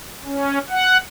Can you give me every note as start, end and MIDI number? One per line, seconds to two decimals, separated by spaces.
0.25 0.59 61
0.70 0.97 78